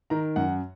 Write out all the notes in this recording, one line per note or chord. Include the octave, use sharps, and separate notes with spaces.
D#3 A#5
F#2 F#5